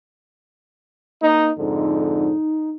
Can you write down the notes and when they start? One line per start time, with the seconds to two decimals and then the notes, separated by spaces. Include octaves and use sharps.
1.23 A#3 D#4
1.58 F2 G#2 D3 D#4